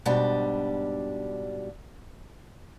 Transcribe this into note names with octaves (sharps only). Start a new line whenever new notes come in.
G#2 B2 G3 D4